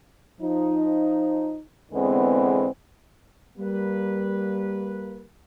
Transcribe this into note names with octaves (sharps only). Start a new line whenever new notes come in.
F3 D#4
E2 D3 G#3 B3 C4
G3 A#3 B4